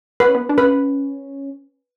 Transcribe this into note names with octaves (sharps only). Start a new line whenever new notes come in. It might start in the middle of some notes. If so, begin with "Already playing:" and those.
B3 B4
C#4
B3
D4
C#4 B4